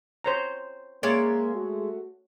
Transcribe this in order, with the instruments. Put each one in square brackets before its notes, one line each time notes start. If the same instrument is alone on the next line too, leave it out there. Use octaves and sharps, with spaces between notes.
[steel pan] C5 C#5 A#5
[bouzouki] G#3 E5 [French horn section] A#3 [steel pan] C#5 D5
[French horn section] A3 F#4